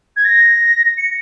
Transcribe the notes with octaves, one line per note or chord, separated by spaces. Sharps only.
G#6
A#6
C#7